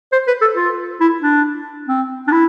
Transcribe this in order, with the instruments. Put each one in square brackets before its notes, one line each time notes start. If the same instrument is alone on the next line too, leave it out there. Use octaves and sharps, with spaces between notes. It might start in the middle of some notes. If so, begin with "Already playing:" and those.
[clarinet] C5
B4
A4
F4
E4
D4
C4
D4
E4